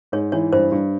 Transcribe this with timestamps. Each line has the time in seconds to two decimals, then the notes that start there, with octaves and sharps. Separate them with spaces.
0.12 G#2 C#5
0.32 E3 C#5
0.53 G2 C5
0.72 G2